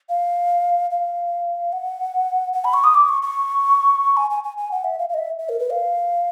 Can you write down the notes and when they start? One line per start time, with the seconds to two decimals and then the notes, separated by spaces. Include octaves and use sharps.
0.09 F5
0.91 F5
1.73 F#5
2.53 F#5
2.65 B5
2.74 C#6
2.84 D#6
2.94 D6
3.09 C#6
3.22 C#6
4.17 G#5
4.30 G#5
4.44 G#5
4.57 G#5
4.72 F#5
4.84 E5
4.99 F5
5.09 F5
5.14 D#5
5.18 E5
5.40 E5
5.49 A#4
5.59 B4
5.70 F5